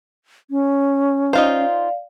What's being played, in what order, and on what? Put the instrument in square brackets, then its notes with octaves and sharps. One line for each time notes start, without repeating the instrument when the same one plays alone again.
[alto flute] C#4
[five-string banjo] D#4 F4 C5 [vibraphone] D5 F5